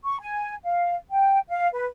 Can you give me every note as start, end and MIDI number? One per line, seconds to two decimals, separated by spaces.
0.04 0.17 85
0.20 0.55 80
0.64 0.95 77
1.10 1.39 79
1.49 1.68 77
1.73 1.85 71